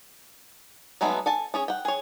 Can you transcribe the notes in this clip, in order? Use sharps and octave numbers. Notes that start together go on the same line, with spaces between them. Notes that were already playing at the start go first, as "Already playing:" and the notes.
F#3 G#3 A3 B3 D#4
A4 G#5 A5
C#4 G#4 C#5
F#5 G5
G#4 C#5